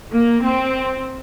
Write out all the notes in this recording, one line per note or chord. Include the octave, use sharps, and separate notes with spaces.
A#3
C4